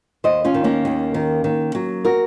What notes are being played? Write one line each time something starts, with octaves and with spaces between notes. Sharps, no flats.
D#2 C5 D#5
C#4 F4
D#3
A#3 C#4
D#2
D#3
D#3
F#3
F#4 A#4